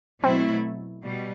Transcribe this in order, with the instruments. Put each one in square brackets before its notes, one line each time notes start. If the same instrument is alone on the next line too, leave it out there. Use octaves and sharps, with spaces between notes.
[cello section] B2 F#3 A3 E4 [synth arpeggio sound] C4
[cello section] B2 G3